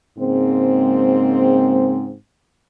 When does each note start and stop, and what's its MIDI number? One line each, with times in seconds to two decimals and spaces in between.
0.18 2.12 44
0.18 2.12 49
0.18 2.12 56
0.18 2.12 58
0.18 2.12 60